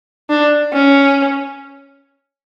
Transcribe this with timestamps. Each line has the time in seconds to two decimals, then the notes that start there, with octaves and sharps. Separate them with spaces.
0.30 D4
0.73 C#4